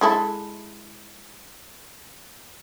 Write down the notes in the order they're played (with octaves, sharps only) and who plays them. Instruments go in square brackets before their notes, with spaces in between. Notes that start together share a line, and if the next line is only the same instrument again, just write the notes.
[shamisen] G#3 E4 A4